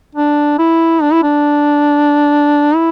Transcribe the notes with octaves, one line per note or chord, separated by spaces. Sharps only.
D4
E4
D4
E4
D4
E4